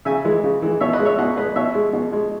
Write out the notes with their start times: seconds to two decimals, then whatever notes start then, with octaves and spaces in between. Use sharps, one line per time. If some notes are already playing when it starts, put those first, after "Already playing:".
0.05 C#3 E5 G#5
0.25 E3 G#3
0.44 C#3
0.62 E3 G#3
0.81 B2 C#5 E5
0.93 B4 D#5
0.99 G#3
1.05 C#5 E5
1.18 B2 D#5 F#5
1.37 G#3 B4 D#5
1.56 B2 C#5 E5
1.74 G#3
1.93 B2
2.13 G#3